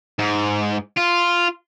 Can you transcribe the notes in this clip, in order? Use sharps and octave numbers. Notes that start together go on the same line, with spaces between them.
G#2
F4